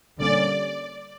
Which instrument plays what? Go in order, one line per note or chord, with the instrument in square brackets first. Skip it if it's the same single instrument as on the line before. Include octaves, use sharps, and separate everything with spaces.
[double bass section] D3 G3 A#3 C#4 [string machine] D5